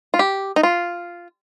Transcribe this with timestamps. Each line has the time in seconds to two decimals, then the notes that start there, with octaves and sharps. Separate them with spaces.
0.14 F4
0.19 G4
0.56 D#4
0.63 F4